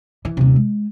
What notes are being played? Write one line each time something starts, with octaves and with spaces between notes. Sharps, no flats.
E3
D#1 C3
G#3